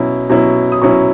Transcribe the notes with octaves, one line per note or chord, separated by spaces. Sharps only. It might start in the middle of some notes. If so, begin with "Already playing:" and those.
Already playing: B2 F#3 C#4 E4
B2 F#3 C#4 E4
D#6
B2 F#3 C#4 E4 C#6